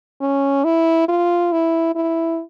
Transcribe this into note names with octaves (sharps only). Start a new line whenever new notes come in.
C#4
E4
F4
E4
E4